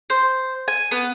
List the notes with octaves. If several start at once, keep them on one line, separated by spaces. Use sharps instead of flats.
C5
G#5
B3